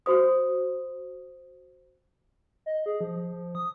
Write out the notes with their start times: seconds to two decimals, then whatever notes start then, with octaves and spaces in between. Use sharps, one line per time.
0.06 F#4 C5 D#6
2.66 D#5
2.86 G#4
3.01 F3
3.17 F3
3.32 F3
3.55 D#6